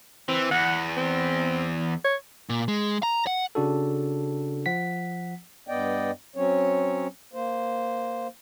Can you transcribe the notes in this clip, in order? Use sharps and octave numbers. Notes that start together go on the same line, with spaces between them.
E3 C4
E2 F#5
C4
C#5
A#2
G#3
A#5
F#5
C#3 D4 F#4 A4
F3 F#5 B6
G2 B3 D5 D#5 G5
F#3 C4 C#4 C#5
A#3 C5